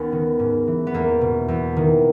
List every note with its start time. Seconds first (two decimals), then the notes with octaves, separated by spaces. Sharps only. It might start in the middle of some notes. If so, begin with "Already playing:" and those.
Already playing: D#2 B3 C#4
0.12 D#3
0.39 G#2
0.67 E3
0.87 B3
0.94 E2 A#3
1.21 B2
1.48 E2
1.76 D#3